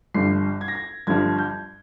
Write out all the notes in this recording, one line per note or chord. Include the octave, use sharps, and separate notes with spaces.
G1 G2 F3 C7
G#6
A#6
G#6
G1 G2 F3 G#6
G6